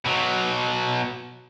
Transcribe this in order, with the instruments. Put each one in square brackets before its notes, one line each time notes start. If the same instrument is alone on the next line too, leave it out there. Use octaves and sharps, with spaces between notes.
[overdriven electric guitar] B2 F#3